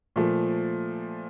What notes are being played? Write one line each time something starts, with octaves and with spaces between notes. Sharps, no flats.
A#2 F3 A3